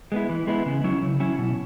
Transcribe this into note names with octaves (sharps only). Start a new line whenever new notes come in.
G#3 B3 E4
E3
G#3 B3 E4
C#3
F#3 C#4 E4
C#3
F#3 C#4 E4
B2